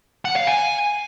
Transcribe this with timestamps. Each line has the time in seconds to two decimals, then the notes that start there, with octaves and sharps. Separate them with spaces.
0.25 F#5
0.36 F5
0.47 G#5